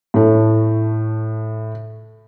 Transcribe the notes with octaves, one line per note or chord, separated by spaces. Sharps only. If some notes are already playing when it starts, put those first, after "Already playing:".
A2 A3